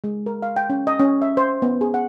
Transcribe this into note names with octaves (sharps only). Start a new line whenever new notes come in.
G#3
A#4
F5
G5
C#4
D#5
C#4
E5
C5
B3
G#4
F#5